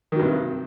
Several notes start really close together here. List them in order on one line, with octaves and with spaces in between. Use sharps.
D#3 F#3 G2 C3